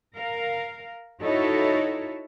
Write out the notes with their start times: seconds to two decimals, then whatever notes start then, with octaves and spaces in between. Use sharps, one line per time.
0.15 A#4 F5
1.20 D#4 E4 F#4 A4 C#5